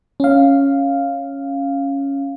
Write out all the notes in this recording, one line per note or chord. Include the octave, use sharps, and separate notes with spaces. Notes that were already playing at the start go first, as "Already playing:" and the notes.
C#4 F5